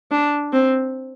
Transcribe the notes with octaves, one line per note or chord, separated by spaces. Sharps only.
D4
C4